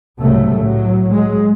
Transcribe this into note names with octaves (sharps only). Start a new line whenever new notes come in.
C2 G#2 C#3 F#3 A3
A2 F#3
F#3 G#3